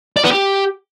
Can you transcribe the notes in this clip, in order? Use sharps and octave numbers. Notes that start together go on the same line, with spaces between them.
D5
B3
G4